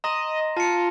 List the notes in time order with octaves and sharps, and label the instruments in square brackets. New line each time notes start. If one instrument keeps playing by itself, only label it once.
[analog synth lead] D#5 [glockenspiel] A#5 C6 A#6
[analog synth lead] F4 [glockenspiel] A5 C#7